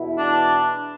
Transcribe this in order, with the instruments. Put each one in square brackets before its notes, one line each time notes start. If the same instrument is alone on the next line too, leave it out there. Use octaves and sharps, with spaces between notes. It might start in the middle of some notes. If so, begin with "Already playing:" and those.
Already playing: [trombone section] E2 B2 B3 E4
[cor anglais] D4